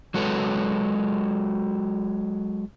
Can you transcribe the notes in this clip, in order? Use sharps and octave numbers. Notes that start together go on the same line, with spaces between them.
F#3 G#3 F#4 A4 B4 C#5